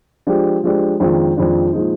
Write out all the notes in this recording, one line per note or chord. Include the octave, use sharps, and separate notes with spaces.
F3 G#3 D4 G4
F3 G#3 D4 G4
F2 D#3 G#3 D4 F4
F2 D#3 G#3 D4 F4
A#2 F3 G#3 D#4